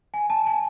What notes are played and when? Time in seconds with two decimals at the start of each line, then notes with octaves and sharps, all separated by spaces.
0.14 G#5
0.30 A5
0.46 G#5